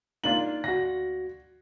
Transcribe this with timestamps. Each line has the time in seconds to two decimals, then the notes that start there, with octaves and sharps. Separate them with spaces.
0.24 A#3 D4 D#4 F4 F#7
0.64 D2 F#4 A#6